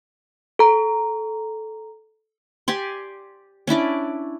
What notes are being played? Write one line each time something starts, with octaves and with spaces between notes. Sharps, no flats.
A4 A#5
G4 D5 G#5 C6
C#4 D4 E4 D5